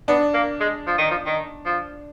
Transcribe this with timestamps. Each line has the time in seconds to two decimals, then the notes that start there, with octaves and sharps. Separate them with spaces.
0.08 B3 D4
0.34 A#3
0.60 G#3
0.87 F3
0.98 D#3
1.10 F3
1.26 D#3
1.65 F3